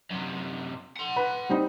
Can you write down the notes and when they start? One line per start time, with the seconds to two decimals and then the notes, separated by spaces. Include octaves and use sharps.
0.11 F#2 C3
0.96 F#5 C6
1.16 B4
1.50 G3 C4 D#4